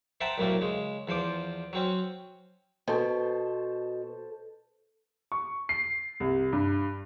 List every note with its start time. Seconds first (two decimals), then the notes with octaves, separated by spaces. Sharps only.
0.21 C5 E5 F#5 G5 A5 A#5
0.38 C2 F#2 A2 A3 A#3
0.61 C#3 G#3
1.08 E2 F3 C5 D6
1.73 F#3 C4 C#4
2.87 B2 A4 C5
5.32 C#6
5.69 C7
6.20 C2
6.52 G2